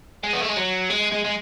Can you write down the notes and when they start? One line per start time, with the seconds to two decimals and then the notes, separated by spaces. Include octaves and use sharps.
0.24 G#3
0.33 B3
0.41 A3
0.49 G#3
0.57 F#3
0.90 G#3
1.12 G#3
1.24 G#3